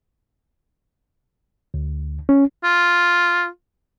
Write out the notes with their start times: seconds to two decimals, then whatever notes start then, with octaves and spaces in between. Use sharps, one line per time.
1.74 D2
2.29 C#4
2.64 F4